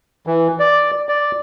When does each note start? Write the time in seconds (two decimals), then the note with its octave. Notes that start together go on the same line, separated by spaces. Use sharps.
0.27 E3
0.59 D5
1.09 D5